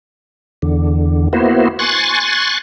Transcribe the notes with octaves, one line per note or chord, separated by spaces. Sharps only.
E2 D3
A#3 B3 E4 F#4 C5
G#5 C6 C#6 F#6 A6